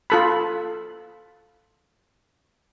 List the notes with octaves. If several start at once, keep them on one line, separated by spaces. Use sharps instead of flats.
F4 A4 B5